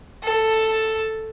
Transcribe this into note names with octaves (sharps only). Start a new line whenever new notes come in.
A4